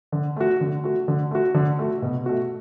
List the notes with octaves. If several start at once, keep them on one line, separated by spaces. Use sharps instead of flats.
D3
A3 F#4
D3
A3 F#4
D3
A3 F#4
D3
A3 F#4
B2
A3 F#4